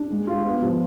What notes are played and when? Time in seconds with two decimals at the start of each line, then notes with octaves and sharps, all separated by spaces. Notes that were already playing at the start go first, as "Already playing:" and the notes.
Already playing: D4
0.11 G#3
0.27 F4
0.45 B3
0.62 F3